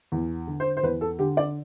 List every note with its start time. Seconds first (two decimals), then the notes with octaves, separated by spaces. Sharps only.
0.12 E2
0.47 D3
0.60 C5
0.77 C5
0.83 E2 B4
1.01 A4
1.19 D3 G4
1.37 D5